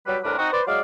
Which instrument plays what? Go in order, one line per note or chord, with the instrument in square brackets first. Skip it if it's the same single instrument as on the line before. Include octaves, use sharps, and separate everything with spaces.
[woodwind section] F#3 G3 B4
C2 A2 C3 D4 A#4 B4
C4 D#4 F#4
B4 C5 D5
F#3 G#3 D5 F5